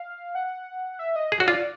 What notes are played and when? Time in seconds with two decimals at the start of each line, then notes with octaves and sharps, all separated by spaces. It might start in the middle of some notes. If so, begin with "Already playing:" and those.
Already playing: F5
0.35 F#5
0.99 E5
1.16 D#5
1.32 G#4
1.40 F#4 C#5
1.48 F4 D5